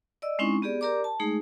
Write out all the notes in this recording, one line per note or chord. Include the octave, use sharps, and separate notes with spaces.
D5 D#5 E6
G#3 C4 C#4 D#4 E4 C#6
B3 G4 G#4 D5
G4 A#4 D5 A#5 D6
A5
G#3 A3 D#4 G#4